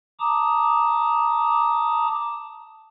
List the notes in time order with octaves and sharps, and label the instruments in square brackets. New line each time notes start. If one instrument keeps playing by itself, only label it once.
[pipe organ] A5 A#5 D6 D#6